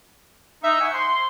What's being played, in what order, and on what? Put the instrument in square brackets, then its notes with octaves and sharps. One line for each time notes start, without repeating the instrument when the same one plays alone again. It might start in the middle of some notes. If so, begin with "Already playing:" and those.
[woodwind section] D#4 [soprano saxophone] E5
[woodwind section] F#5 G#5 C#6
[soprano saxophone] C5 [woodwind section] C6